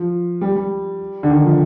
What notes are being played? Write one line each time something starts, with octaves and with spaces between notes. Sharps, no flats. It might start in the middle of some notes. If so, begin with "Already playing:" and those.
Already playing: F3
G3
G3
D3
D#3
F3